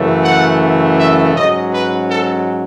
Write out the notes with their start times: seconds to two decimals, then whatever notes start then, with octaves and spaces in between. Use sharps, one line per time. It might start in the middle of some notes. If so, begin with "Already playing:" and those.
Already playing: F#2 C#3 E3 A3
0.22 F#5
0.97 E5
1.35 G#2 F#3 C#4 D#5
1.72 B4
2.10 A4